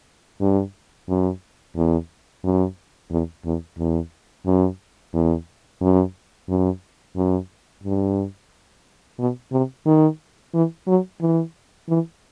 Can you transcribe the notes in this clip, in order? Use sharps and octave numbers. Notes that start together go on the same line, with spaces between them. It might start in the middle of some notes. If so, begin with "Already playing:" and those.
G2
F#2
E2
F#2
E2
E2
E2
F#2
E2
F#2
F#2
F#2
G2
B2
C3
D#3
E3
F#3
E3
E3